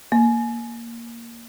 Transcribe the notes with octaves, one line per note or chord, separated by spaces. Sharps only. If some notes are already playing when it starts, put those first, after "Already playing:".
A#3